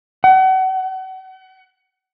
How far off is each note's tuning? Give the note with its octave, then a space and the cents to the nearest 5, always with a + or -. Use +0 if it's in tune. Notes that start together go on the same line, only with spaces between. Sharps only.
F#5 +35